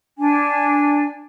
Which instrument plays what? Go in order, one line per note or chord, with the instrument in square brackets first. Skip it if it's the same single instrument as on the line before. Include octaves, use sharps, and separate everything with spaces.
[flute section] D4 G#5